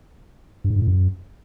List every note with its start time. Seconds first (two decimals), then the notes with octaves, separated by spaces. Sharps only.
0.64 G2
0.70 G#2
0.76 G2
0.82 A2
0.88 F#2